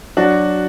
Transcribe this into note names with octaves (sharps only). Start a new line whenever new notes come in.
F#3 D4 F#4